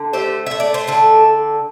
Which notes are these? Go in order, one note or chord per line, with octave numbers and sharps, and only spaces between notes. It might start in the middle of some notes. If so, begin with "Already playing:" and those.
Already playing: D3
A3 G4 C5
A3 E5
D5
C5
D3 A4